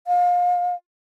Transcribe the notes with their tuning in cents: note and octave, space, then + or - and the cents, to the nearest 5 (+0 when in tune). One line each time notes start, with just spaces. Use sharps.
F5 +30